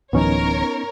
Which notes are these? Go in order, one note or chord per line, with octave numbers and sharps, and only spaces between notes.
D1 E3 F#3 B3 C#4 D#4 A#4 C#5